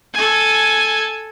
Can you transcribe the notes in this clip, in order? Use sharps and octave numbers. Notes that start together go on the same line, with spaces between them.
A4 G#5